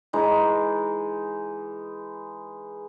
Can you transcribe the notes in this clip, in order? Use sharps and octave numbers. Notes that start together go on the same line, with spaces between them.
E3 G#3 D#4